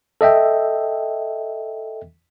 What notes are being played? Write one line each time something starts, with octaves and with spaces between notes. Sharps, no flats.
A4 D#5 E5 G5